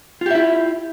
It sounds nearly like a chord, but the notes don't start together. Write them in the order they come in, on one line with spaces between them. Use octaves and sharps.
F4 G4 E5 E4